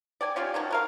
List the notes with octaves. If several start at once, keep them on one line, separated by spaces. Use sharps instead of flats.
D5 G5 G#5
C#4 F4 G4 D5
D#3 F3 F#3 C#4
A3 A#4 F5